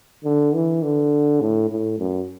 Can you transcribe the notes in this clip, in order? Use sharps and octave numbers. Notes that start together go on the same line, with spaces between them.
D3
E3
D3
A2
A2
F#2